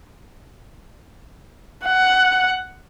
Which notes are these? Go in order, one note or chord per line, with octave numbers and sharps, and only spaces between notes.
F#5